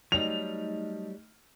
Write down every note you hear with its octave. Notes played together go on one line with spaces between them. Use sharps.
F#3 G3 A3 D#4 D#5 F7